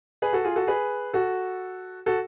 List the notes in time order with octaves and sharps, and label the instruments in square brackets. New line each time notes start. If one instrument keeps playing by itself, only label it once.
[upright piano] G#4 B4
F#4 A4
F4 G#4
F#4 A4
G#4 B4
F#4 A4
F#4 A4